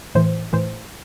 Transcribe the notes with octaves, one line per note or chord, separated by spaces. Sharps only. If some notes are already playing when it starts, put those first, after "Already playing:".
A2 E3 C5
A2 E3 C5